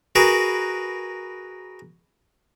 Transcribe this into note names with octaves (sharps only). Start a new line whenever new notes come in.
F#4 G#4 A#4 B4